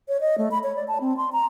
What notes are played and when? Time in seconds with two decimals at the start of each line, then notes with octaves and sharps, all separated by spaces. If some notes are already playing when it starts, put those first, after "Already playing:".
0.08 C#5
0.21 D#5
0.38 A3
0.51 B5
0.63 C#5
0.76 D5
0.88 A5
1.01 C4
1.17 C6
1.32 A#5